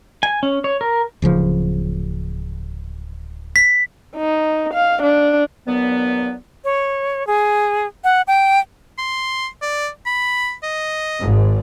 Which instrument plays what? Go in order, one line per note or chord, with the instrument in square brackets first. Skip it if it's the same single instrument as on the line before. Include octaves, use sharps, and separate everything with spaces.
[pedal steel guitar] G#5
C#4
C#5
A#4
[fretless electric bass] D1 C#3 F3
[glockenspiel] B6
[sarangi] D#4
F5
D4
[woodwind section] G2 A#2 D#3 F#3 B3
[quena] C#5
G#4
F#5
G5
[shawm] C6
D5
B5
D#5
[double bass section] G#1 G#2